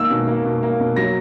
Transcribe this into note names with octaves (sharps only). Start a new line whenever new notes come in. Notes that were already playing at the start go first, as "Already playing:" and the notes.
Already playing: D#3 A#3 E6
B2
A#3
B2
A#3
B2
F#3 A#6